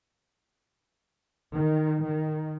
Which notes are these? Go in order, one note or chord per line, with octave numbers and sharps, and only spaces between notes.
D#3
D#3